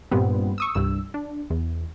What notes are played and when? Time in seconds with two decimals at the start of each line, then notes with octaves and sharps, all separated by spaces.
0.11 G2 A#2 G3 B3 C4
0.58 C#6 D#6 E6
0.75 C2 G2 E6
1.14 D4
1.50 E2